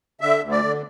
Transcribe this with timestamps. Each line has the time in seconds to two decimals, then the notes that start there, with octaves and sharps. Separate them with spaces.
0.21 D3 E5
0.41 D2
0.51 D5
0.62 D3